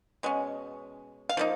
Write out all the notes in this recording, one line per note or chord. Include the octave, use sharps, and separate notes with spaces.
B2 G#3 C#4
F5
F3 A#3 D#4